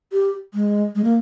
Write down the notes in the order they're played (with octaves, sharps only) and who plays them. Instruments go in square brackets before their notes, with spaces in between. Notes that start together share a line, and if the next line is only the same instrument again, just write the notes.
[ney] G4
G#3
G#3
A#3